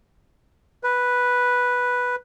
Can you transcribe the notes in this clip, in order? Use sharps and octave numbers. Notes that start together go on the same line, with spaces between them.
B4